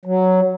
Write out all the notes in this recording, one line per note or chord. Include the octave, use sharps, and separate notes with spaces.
F#3